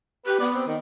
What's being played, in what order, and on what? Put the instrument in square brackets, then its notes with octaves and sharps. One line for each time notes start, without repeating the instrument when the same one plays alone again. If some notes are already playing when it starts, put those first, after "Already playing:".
[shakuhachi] G4 [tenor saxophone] B4
[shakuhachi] B3 [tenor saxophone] D5
[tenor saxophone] C4
D#3